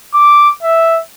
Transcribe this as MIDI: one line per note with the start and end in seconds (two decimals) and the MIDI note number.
0.14 0.49 86
0.63 0.98 76